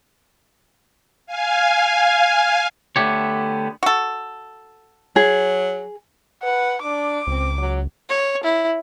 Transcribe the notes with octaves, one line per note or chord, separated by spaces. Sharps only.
F5 G#5
D3 A3 B3 G4 C#5
F#4 A4
F#3 G#4
B4 F#5
D4 D6
C#2 C4
F#3
C#5
E4